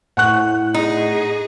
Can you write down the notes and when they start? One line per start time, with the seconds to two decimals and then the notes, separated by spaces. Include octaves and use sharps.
0.17 A2 F#5 C#6 F#6
0.74 D#4 G#4